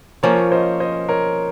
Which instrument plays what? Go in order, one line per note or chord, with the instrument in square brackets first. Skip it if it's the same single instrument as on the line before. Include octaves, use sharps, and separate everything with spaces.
[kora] F3 A#3 C#4 [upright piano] A#4 C#5
[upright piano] C5 D#5
C5 D#5
A#4 C#5